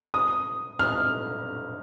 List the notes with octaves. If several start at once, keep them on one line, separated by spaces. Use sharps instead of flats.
D#6
F6